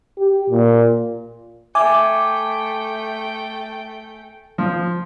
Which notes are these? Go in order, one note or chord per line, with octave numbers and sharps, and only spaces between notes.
G4
A#2
A3 E5 G5 G#5 D6
F3